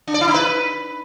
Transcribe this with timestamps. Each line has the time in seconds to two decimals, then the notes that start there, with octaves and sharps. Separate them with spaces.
0.07 D4
0.14 D5
0.21 E4
0.28 D#4
0.34 B4